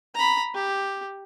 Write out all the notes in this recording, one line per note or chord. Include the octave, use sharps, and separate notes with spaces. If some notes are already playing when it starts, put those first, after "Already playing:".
A#5 B5
G4